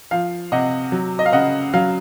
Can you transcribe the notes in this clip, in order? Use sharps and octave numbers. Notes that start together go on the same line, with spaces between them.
F3 F5
C3 D#5 F#5
F#3
D#5
F5
C#3 D#5 F#5
F#3 F5